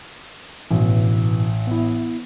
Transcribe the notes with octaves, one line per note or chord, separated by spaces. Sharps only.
A1 G2 B2 E3
B3 E4